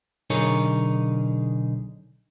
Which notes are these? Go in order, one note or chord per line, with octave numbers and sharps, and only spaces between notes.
B1 D3 D#4 G#4 A#4 C#5